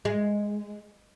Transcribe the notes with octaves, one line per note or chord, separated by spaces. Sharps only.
G#3